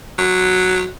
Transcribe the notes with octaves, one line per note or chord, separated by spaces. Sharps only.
F#3